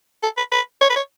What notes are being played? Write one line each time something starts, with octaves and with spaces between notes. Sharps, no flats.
A4
B4
B4
C#5
B4
C#5